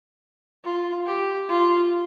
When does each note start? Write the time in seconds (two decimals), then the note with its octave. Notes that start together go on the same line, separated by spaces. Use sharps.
0.64 F4
1.06 G4
1.49 F4